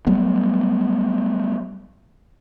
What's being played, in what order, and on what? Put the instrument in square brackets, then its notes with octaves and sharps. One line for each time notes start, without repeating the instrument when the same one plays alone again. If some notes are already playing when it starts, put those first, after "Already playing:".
[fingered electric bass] F#3 G3 A3 B3